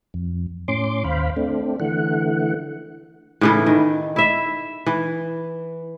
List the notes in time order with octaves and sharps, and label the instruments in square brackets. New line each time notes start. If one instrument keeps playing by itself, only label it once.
[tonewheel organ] F2
A2 C#4 C6 D6
D#2 C5 F5 B5
A3 C4 D4
D3 E3 A3 F#5
[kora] A2 C#3 E3
D#3
E4 E5
E3